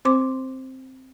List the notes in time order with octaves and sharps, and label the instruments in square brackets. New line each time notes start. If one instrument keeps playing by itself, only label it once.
[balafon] C4 C5 C6 D6